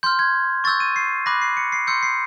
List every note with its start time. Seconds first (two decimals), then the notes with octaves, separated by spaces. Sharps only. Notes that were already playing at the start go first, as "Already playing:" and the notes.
0.03 C6 F6 G6
0.19 G#6
0.64 C#6 E6 G6 A6
0.80 D#7
0.96 C7
1.26 B5 D6 F#6 A#6
1.42 C7
1.57 C#7
1.72 C7
1.87 C6 E6 G6 C#7
2.03 C7